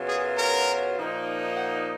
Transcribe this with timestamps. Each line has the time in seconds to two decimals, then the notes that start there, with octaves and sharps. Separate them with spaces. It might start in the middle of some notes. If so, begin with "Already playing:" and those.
Already playing: F#2 C#3 F#3 B3 F4
0.08 G#4
0.38 A#4
0.97 A#2 F3 A#3 D#4
1.56 F#5